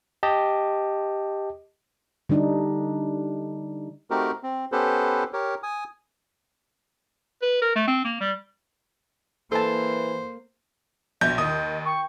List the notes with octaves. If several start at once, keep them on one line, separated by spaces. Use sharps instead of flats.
G4 D#5 A5
D3 G3 D4 D#4
A3 C4 D#4 F#4 G4 A#4
C4
B3 C#4 G4 A4 B4 C5
G4 A#4 C#5
G#5 D#6
B4
A#4
A3
C4
A#3
G3
E3 A#3 A4 C5 A5
A#1 B2 E5 G6
D#2 D#5 D#6
G5 C#6